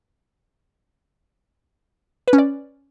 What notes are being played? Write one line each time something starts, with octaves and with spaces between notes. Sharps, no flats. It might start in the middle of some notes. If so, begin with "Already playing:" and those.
B4
C#4
D5